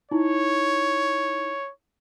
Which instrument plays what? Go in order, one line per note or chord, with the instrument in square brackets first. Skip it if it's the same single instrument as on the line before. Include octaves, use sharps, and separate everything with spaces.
[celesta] D#4 E4 [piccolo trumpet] C#5